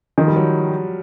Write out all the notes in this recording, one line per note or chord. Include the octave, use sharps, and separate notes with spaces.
D#3 F3
G3
F#3